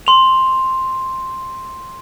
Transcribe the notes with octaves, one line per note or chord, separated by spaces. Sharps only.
C6 F7